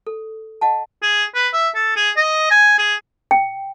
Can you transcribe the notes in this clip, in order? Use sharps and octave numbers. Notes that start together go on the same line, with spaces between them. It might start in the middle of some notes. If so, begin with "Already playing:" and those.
A4
D#5 F#5 A5
G#4
B4
E5
A4
G#4
D#5
G#5
G#4
G5